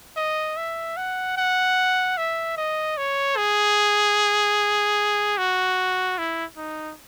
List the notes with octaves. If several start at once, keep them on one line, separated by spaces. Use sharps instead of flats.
D#5
E5
F#5
F#5
E5
D#5
C#5
G#4
F#4
E4
D#4